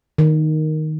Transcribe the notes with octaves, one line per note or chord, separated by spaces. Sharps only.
D#3